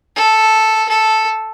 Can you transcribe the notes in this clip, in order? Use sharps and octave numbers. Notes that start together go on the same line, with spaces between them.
A4
A4